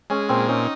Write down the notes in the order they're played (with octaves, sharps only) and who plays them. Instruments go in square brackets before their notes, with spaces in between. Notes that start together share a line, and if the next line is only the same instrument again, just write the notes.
[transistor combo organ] G#3 [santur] C#4
[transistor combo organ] A#2 [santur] C4
[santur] C#4 [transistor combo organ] D#4